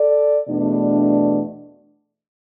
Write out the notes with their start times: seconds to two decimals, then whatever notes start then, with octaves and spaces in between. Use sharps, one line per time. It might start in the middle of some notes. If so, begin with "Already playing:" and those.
Already playing: A4 D5
0.47 E2 B2 A3 D4